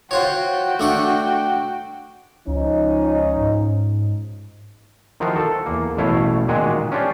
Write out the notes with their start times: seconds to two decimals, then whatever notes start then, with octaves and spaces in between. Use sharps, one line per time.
0.11 F4 F#4 C5 C#5 G5
0.79 A3 D4 F#5
2.47 C#2 F3 C#4 D#4
3.37 G#2
5.20 D#3 F3 E4 F#4 A#4 C5
5.36 A4
5.66 E2 A#3
5.97 A1 B2 A3 E4 C#5 F5
6.48 A#2 D#3 G#3 F#4 G#4
6.92 C#4 D4 F4 G4 C5 D5